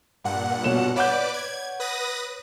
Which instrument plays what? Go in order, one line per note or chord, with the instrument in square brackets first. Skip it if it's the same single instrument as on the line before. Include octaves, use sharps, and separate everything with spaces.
[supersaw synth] G2 A#2 F#5
[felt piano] B2 C#5 E7
[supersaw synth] B4 D5 D6 [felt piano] C#5 F#5 G6
[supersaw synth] G#6
B4 D#6 A#6